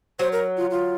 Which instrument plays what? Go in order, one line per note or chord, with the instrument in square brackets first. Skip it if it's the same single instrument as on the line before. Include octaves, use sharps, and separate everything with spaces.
[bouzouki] F#3 [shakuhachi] C5
[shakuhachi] A#4
F4
F4